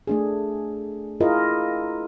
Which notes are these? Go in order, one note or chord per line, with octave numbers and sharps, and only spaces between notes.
A3 D4 G#4
E4 F4 G#4 A#4 D#5